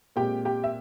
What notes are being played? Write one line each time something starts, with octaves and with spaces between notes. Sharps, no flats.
A#2 G#3 C4 G4 G5
G4 G5
E5